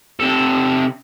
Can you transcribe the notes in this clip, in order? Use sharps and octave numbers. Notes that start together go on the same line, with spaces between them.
C3 A4